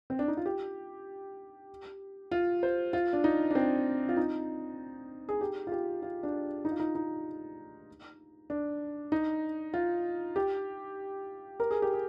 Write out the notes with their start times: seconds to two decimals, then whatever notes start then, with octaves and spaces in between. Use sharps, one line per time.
0.10 C4
0.19 D4
0.28 D#4
0.37 F4
0.46 G4
2.32 F4
2.63 C5
2.93 F4
3.13 D4
3.24 D#4
3.51 D4
3.55 C4
4.09 F4
4.17 D#4
5.29 G#4
5.41 G4
5.67 F4
5.72 G4
6.02 F4
6.23 D4
6.65 D#4
6.71 F4
6.80 D#4
6.95 D#4
8.50 D4
9.12 D#4
9.74 F4
10.36 G4
11.60 A#4
11.71 G#4
11.82 G4
11.93 G#4